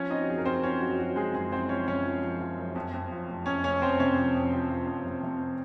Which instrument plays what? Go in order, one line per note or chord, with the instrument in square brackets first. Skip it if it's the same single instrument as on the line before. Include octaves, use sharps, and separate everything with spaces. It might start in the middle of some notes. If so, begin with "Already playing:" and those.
Already playing: [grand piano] F3 C#4 C#5
C4 D#4 D#5
F#4
F#1 G#4
A#4
C4 C5
F3 C#4 C#5
F#2 F#4
F3 F#4
F3 G#3 G#4
F#1 G#3 G#4
F#1 C4 C5
F3 C#4 C#5
F#1 C#4 C#5
F3
F3
F3
F#2
F2
F2
F3
F1
F2 C#4 C#5
F1 C#4 C#5
F1 C4 C5
C3 C#4 C#5
F3
F2
F3
F3
F2
C3
C3